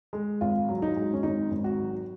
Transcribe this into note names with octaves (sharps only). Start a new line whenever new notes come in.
G#3
G#1 F4
F#3
D#4
G#2
C#4
G#1 D#4
G#1
F#4
F#3